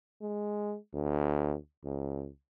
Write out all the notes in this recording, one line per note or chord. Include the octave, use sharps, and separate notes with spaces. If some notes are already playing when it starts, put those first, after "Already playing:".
G#3
D2
C#2